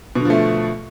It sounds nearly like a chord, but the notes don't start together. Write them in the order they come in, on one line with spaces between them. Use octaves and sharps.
B2 D3 F3 A3